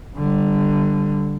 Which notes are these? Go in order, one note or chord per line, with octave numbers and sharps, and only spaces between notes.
D3 G3